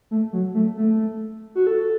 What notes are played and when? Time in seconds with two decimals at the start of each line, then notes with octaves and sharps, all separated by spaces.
0.11 A3
0.33 F#3
0.54 A3
0.77 A3
1.55 F#4
1.67 A4